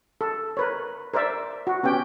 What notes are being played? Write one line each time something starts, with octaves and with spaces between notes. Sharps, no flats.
A4
A#4 B4 C#5
A#4 C5 D5 E5
F#4
B3 C#4 G4 G5